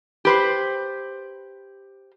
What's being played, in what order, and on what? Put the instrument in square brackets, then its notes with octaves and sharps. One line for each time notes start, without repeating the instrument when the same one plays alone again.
[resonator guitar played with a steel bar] G4 B4 C5